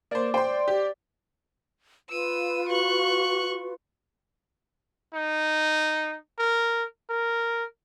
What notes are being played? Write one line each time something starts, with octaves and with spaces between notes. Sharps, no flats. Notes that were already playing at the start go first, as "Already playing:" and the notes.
A#3 C5 D5
C5 G5 C6
G4
F4 B4 E6 D#7
F#4 C#6 F#6
D#4
A#4
A#4